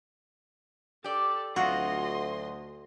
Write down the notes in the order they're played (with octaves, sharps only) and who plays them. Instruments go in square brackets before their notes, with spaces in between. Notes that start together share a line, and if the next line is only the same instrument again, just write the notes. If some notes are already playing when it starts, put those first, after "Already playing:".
[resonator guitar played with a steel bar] G4 D5 [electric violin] A4
[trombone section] D2 [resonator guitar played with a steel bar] F#3 C4 F4 [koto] F#4 [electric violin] D#5 C6